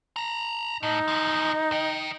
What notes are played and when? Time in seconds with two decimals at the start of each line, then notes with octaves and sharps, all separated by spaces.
0.16 A5 A#5
0.83 A2 D#4
1.08 E2 F3
1.72 D#5 G5